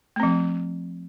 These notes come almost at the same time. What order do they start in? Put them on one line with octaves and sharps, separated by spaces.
A3 C4 F3